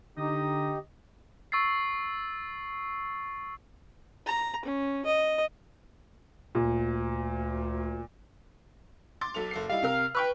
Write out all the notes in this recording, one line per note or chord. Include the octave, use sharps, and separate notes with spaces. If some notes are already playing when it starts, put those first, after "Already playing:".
D3 D#4 G4 D#5
C#6 E6 A6 C7
A#5
C#4
D#5
D2 A#2
C6 D6 A6
B1 A4 F7
F#1 A4 C7
G3 D#4 E4 F5
C3 A#4 F6
B4 G5 C#6 F6